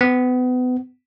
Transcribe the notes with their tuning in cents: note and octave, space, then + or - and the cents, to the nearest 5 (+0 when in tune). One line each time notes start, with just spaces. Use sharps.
B3 +30